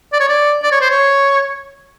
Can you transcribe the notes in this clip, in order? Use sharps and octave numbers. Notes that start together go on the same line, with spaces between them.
D5
C#5
D5
D5
C#5
C5
C#5